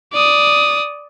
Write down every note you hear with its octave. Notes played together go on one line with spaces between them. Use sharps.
D5 D#6